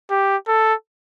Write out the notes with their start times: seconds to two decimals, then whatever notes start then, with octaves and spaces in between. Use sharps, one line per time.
0.11 G4
0.48 A4